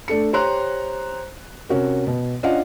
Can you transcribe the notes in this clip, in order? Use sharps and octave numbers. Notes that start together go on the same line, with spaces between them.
A3 D4 A4 C#7
G4 C5 C#5 A#5 C6 F#6
C3 C#4 F#4 A#4
B2
C#4 D4 F4 D#5 F5 F#5